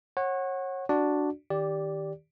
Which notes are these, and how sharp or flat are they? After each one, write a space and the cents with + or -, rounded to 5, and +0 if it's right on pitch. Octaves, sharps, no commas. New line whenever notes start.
C#5 -30 F#5 +0
D4 +0 F#4 +0 D5 +0
D#3 +0 G4 +5 D5 -10